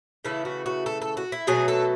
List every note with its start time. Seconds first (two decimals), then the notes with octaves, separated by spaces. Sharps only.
0.25 C#3 E3 A3 E4
0.45 F#4
0.66 F#4
0.86 A4
1.02 A4
1.17 F#4
1.32 E4
1.47 B2 F#3 A3 G#4
1.68 A4